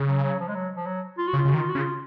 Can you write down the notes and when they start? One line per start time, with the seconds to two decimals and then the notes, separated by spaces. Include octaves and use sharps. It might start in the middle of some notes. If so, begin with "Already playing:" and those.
Already playing: C#3
0.08 F#3
0.23 F#3
0.39 F3
0.48 G#3
0.55 F#3
0.76 F3
0.86 F#3
1.18 F4
1.28 F#4
1.33 C#3
1.38 F4
1.45 C#3 F#4
1.54 D#3
1.59 F4
1.69 F#4
1.75 C#3
1.79 F4